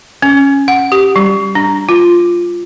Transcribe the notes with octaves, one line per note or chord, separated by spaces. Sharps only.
C#4
F#5
G4
G3
D4
F4